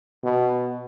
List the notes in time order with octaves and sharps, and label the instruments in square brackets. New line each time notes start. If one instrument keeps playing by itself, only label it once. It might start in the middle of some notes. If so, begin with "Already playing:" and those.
[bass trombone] B2